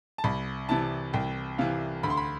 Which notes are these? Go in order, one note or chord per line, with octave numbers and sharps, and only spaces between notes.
A5
C2 B5
C3 E3 A5
C2 G5
C3 E3 F5
D2 B5
C6
B5